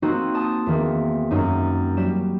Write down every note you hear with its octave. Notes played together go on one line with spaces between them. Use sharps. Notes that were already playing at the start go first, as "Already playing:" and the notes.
A#3 C4 D#4 F#4
A5 D#6
E2 D#3 A#3
F#2 D#4
F#3 G3 E7